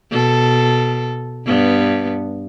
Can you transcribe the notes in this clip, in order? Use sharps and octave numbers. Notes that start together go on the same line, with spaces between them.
B2 A4
G2 B3